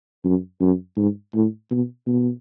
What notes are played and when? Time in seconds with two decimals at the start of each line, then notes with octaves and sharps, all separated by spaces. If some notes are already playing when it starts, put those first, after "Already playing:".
0.25 F#2
0.61 F#2
0.97 G#2
1.35 A2
1.71 B2
2.07 B2